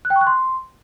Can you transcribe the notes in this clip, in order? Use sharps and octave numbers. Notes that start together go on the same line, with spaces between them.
F#6
G5
C#6
F#6
C6